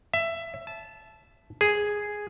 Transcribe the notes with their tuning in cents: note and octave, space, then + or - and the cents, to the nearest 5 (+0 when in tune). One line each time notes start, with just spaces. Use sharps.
E5 +15
A5 -15
G#4 +0